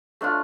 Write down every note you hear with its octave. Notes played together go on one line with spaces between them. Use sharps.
A3 D4 F4